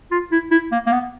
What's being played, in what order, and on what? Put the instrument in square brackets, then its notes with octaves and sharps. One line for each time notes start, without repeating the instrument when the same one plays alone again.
[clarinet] F4
E4
E4
A#3
A#3
B3